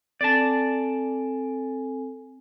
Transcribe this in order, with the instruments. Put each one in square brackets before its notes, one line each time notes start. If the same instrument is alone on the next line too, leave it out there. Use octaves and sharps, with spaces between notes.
[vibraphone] C4 A4 G#5 [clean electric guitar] D5 A5